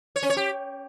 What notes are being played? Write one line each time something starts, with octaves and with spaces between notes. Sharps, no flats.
C#5
C#4
C#5
G4